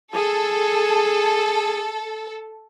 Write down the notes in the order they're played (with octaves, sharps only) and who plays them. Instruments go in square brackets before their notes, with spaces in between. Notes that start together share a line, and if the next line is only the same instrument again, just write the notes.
[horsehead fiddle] G#4 [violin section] A4